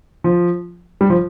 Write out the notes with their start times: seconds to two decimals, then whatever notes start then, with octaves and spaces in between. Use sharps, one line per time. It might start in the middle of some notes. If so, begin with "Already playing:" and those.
0.24 F3
1.01 G3
1.10 F3